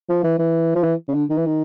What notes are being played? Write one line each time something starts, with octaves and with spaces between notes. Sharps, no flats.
F3
E3
E3
F3
E3
C#3
D3
D#3
E3
D#3